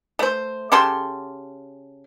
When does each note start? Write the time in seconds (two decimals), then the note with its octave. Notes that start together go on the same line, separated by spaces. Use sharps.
0.19 A3 C5
0.72 C#3 G4 A4 C6